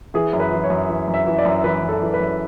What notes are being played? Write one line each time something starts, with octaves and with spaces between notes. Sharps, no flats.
E3 G#4
F#2
B4
E3
C#5
F#2
E3
F#2
E5
E3
D5
F#2
E3 B4
F#2
A4
E3
B4
F#2